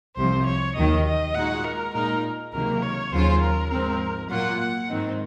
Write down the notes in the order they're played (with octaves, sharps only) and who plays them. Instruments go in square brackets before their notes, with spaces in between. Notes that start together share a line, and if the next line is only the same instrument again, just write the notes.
[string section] C2 C3 F3 [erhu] C5
[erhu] C#5
[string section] D#2 D#3 F#3 [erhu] D#5
[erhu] D#5
[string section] A#2 G#3 D#4 F#4 [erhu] F#5
[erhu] A#4
[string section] A#2 G#3 D#4 [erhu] A#4
[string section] C#2 C3 D#3 F#3 A#3 [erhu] A#4
[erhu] C#5
[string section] D#2 C#3 F#3 C#4 F4 [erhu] C5
[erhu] A#4
[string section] G#2 F3 C4 [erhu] A#4
[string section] A#2 F#3 A#3 F4 [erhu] F#5
[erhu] F#5
[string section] G#2 D#3 F#3 C4 D#4